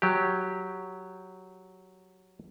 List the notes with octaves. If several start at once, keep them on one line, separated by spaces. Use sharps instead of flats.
F#3 G4